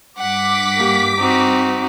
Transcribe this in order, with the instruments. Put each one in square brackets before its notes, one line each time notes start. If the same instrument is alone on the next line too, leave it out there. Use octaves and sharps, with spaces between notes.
[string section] G2 D6 B6 [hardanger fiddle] F#5
[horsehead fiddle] A#3 G4
[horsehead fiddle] C4 [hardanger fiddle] D#4 F#4